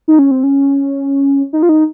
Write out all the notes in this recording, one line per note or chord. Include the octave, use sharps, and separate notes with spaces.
D#4
C#4
C4
C#4
D#4
F4
D#4